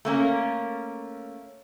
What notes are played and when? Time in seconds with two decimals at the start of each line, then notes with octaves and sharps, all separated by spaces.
0.05 A3 A#3 C#4